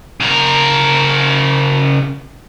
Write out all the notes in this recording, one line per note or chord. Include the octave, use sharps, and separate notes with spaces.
C#3 A#4